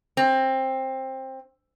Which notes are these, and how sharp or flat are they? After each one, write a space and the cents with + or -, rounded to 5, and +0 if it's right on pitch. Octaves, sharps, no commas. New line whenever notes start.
C4 +15